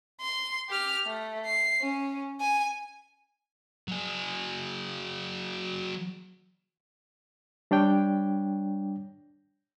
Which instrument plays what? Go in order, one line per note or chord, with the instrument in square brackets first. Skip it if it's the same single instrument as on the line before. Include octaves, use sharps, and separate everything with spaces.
[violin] C6
G4 F6
A3
C7
C#4
G#5
[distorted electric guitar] F#3 G#4
[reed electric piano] G3 D4 C#5 G5